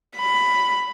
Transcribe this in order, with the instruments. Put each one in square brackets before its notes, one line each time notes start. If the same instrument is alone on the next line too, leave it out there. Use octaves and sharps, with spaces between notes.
[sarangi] B5